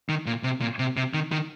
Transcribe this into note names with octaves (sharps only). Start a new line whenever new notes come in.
D#3
A#2
C3
A#2
C3
C3
D#3
D#3